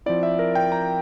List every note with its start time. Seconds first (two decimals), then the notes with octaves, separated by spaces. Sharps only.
0.06 F3 C4 E4 D5
0.23 E5
0.39 A#4
0.55 G5
0.72 A#5